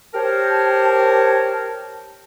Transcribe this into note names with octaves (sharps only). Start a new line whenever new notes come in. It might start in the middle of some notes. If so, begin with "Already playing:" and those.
G4 A#4 C5 C#5 A5